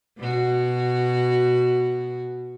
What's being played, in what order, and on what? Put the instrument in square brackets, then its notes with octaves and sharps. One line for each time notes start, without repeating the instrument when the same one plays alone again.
[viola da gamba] B2 F#4